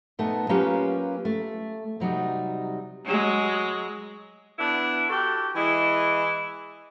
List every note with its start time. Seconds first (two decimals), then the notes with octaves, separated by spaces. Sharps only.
0.19 A#2 A3 B3 D#4 A5
0.49 F#3 A#3 C#4 F4 G4 B4
1.25 A3
2.00 C3 F#3 G3 D#4
3.05 F#3 G#3
4.59 B3 D4 E4
5.09 F#4 G4 A4
5.55 E3 G#3 E4